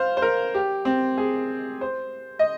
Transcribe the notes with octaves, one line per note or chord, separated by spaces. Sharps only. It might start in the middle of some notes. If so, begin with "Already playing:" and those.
Already playing: C5 F5
C5
A#4
G4
C4
G#4
C5
D#5